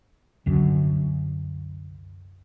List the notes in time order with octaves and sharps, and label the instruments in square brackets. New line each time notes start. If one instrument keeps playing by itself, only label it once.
[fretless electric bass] C2 F#2 D3